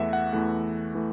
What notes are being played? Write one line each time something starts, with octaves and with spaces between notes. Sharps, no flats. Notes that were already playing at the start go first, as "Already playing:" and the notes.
Already playing: E2 E3 A3 E5 F#5
F#5
E2 E3 A3 F#5
E3 A3